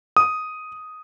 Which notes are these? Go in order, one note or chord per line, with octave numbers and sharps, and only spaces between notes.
D#6